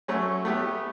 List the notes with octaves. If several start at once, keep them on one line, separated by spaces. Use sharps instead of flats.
F#3 A3 C#4
A3 B3 G4